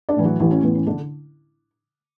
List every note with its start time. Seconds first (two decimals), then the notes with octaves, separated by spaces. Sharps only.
0.09 D4 D5
0.16 A2 E3
0.24 F#3 F#4
0.40 A1 E3 E4
0.51 C#4
0.63 A2 E3 B3
0.75 C#4
0.87 D3 D4